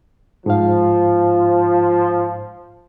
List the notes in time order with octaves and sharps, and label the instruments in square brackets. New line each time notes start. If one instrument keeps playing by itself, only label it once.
[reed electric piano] G#2 F5 [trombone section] F3